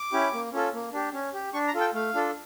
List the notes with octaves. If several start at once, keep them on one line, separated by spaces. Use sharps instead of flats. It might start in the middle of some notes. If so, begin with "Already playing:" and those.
Already playing: D6
C#4 E4 G4
A#3
C#4 F4 A4
A#3
D4 G4
C#4
G4
D4 C#6
A#5
F4 A4
G5
A3 F5
D4 F4 A4